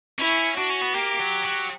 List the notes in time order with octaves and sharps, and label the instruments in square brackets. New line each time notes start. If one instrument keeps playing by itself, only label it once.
[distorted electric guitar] C#4 [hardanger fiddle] E4
[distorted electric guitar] D4 [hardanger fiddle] F#4
[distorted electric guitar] C#4
B3
[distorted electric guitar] A#3 [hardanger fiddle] G4
[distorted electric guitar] F#3
F#3